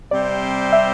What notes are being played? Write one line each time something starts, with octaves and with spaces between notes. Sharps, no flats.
C3 G3 C4 G4 C5 D5
E5